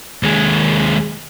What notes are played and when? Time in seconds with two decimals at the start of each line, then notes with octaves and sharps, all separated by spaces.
0.23 D#2 G#3